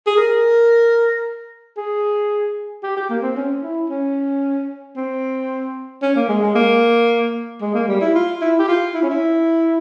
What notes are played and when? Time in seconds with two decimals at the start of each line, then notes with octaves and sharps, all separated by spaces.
0.07 G#4
0.17 A#4
1.77 G#4
2.83 G4
2.97 G4
3.10 A#3
3.23 C4
3.36 C#4
3.62 E4
3.89 C#4
4.96 C4
6.02 C#4
6.16 A#3
6.29 G#3
6.42 G#3
6.55 A#3
7.61 G#3
7.74 A#3
7.88 G3
8.01 E4
8.15 F4
8.41 E4
8.59 G4
8.68 F4
8.94 E4
9.03 C#4
9.10 E4